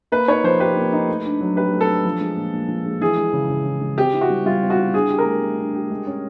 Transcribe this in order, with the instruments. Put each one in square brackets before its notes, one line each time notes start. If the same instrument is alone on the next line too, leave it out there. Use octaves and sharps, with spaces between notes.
[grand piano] A#3 [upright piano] B4
[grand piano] D#4 [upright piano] C#5
[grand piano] F3 [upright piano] C5
[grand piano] G4 [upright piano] B4
[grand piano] A#3
D#4
A3
D4
F#3
[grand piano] G4 [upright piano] B4
[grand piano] A3
[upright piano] A4
[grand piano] D4
F3
G#3
A#2
A#2
F3
G#3
[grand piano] E3 [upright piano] G#4
[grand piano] G#3
C#3
C#3
E3
G#3
[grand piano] C4 [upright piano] G4
[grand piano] E4
[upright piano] F#4
[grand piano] G3
[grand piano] G3 [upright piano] F4
[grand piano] C4
[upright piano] F#4
[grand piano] E4
[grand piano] D4 [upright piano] G#4
[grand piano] G4
[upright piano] A#4
[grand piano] A3
A3
D4
G4
G#3
C#4